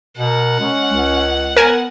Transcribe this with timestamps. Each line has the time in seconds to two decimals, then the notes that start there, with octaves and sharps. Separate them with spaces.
0.18 B2 A#4 F#5
0.60 G#3 C#4
0.93 C#2
1.57 B3 A#4 G#5